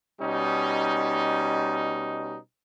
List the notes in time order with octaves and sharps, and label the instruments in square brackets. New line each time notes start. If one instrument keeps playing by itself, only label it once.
[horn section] B2 G3 C#4 D#4